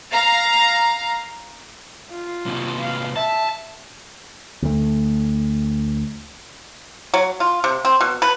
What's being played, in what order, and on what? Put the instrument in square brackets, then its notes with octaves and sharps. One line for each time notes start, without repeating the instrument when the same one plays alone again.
[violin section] F5 A#5
[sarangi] F4
[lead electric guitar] C3 A#3
[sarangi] F5
[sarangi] E5 [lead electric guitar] A5
[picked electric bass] D2 A3
[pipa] F#3
F4
C3
C4
B2
B4